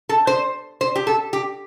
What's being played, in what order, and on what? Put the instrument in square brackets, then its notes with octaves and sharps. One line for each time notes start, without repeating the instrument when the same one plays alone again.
[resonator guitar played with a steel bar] A4
C5
C5
G4
A4
G4